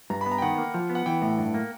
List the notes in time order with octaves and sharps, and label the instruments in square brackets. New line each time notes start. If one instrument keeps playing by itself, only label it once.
[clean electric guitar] G2 [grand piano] A#5
[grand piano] B5
[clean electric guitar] B3
[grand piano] A#5
G5
[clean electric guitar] D#3 [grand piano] F#5
[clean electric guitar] A#3
F3
B3
[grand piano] F#5
[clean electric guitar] E3 [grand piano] G5
[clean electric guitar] A2
G2
A#3